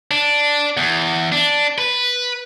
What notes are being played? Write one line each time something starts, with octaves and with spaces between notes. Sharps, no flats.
D4
E2
D4
B4